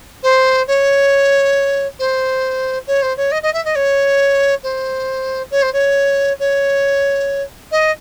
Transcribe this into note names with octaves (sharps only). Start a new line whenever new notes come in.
C5
C#5
C5
C#5
C5
C#5
D#5
D#5
E5
D#5
C#5
C5
C#5
C5
C#5
C#5
D#5